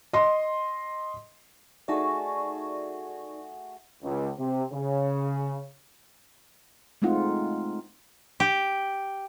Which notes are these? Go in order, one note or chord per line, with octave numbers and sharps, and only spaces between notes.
D#5 C6
A3 D#4 F#4 G#4 D5
C#2
C3
C#3
G#3 A3 C4 D#4 F4 F#5
G4